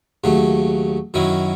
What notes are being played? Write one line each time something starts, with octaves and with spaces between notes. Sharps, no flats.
D#2 C#3 F#3 A3
F#2 D#3 F#3 C#4 E4